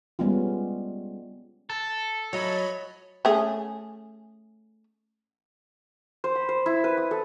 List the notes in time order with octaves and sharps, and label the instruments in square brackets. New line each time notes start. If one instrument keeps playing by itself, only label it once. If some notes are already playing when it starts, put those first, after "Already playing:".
[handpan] G3 G#3 B3 C#4 F4
[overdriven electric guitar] A4
[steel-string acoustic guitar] F#3 [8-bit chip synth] C#5 D#5 B5
[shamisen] A3 C#4 G#4
[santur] C5
B5
C5
E4
B4
D#6
A4